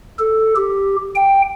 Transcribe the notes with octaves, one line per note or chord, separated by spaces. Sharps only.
A4
G4
G5